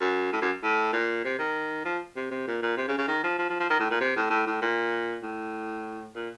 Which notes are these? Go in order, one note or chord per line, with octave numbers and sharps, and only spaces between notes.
F#2
A2
F#2
A2
A#2
C3
D#3
F3
C3
C3
A#2
A#2
C3
C#3
C#3
D#3
F3
F3
F3
F3
D#3
A2
A#2
C3
A2
A2
A2
A#2
A2
A#2